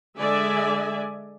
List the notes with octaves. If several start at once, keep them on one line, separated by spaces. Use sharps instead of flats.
D3 G#3 D5 E5 G#5